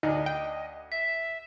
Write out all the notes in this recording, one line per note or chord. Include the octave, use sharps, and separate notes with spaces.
D2 D4 D#4 D#5
G5
E5 B6